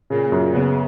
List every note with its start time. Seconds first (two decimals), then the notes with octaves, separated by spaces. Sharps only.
0.10 A#2 C#3
0.32 F#2
0.53 C#3 B3